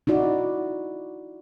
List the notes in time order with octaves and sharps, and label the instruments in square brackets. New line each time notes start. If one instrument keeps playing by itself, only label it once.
[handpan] D#4 E4 F#4 D5